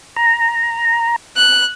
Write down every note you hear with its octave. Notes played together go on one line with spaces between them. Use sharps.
A#5
F#6